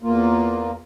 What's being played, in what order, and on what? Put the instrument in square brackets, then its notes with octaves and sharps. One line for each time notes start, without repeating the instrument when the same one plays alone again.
[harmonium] E2 A#3 F4